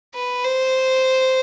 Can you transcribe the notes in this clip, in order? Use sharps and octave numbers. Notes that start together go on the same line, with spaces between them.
B4
C5